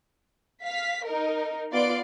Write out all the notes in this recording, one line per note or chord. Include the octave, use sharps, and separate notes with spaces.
F5 B6
D#4 A#4
B3 F4 D5 C6 D7